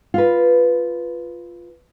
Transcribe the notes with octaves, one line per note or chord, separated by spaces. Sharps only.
F4 B4